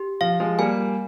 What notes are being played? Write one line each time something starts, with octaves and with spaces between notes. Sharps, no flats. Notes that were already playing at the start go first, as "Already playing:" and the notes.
Already playing: G4
F3 F5
F3 G#3
G3 A#3 G#5